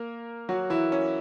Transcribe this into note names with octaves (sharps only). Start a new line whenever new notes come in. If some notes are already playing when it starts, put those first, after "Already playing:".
Already playing: A#3 A#4
F#3 F#4
E3 E4
C#4